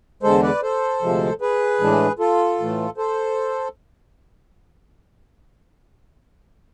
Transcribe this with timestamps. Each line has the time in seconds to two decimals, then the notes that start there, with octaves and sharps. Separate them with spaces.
0.23 E2 D3 G#3 A4 C5
0.43 B4 D5
0.62 A4 C5
1.02 D2 C3 F3 G#3
1.41 G#4 B4
1.80 A2 E3 G#3 D4
2.19 F4 A4
2.59 A2 E3 A3
2.97 A4 C5